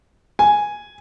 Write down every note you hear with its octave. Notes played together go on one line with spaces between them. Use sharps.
G#5